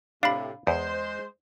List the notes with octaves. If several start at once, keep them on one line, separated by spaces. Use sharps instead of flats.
A2 C3 D4 F5 B5
E2 G#3 C5